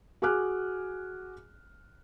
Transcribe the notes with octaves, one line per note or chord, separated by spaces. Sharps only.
F#4 G#4 G#5 D6 F6 F#6